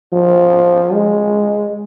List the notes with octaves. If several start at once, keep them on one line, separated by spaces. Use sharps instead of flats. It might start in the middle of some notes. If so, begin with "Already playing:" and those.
F3
G#3